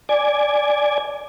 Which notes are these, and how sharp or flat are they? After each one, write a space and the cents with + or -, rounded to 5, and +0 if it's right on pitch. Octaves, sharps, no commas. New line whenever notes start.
D5 +0 G#5 +0